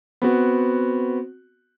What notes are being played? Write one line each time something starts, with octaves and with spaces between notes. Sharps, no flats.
B3 C4 F#4